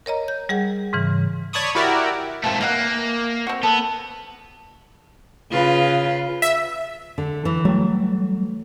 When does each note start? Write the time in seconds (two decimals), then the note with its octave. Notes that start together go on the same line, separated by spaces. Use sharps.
0.06 A#4 C#5 D#5 A#5
0.28 G6
0.49 G3 G#4 F#5
0.93 G#2 C#3 E3
1.53 C#5 D5 A5 B5 C#6 D#6
1.75 E4 F#4 G4 A#4 D5 E5
2.44 G#2 F3 A3 C4
2.61 E3 A#3 F5 F#5
3.47 C4 F#4
3.63 B3 A4
5.51 C#3 F4 B4
6.42 E5
7.18 D3
7.45 E3
7.65 F#3 G3 A3